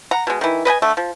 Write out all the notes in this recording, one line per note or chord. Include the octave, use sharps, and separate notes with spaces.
F#5 A#5
B2 G#3
D#3 E3
B4 D#5 G5 G#5
D3 A3
F3